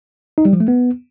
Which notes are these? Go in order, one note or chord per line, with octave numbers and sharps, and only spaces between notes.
D#4
G3
F3
A3
B3